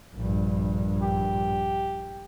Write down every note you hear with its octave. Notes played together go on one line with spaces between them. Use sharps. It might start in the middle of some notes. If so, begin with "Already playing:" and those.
A#1 G2
G4